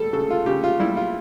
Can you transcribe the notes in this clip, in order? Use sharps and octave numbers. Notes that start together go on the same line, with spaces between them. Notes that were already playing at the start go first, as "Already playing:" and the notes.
Already playing: G3 A4
C#3 A4
F4
C#3 G4
F4
G3 E4
F4